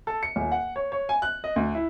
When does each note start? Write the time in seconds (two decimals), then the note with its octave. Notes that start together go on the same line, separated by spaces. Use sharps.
0.07 A4
0.23 C#7
0.36 D#1
0.52 F#5
0.76 C#5
0.92 C#5
1.09 G#5
1.22 F#6
1.44 D#5
1.56 D2
1.75 E4